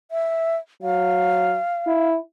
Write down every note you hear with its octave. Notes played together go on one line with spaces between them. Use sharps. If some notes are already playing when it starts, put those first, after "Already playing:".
E5
F#3 F5
E4